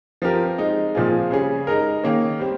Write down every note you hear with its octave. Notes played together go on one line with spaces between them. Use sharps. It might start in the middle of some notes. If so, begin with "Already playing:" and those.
F3 C4 G4 A#4
G#3 C4 D#4
A#2 F3 C4 F4 G#4
C#3 G3 C#4 G#4
G#3 D#4 A#4
D#3 A#3 C#4
G3 C4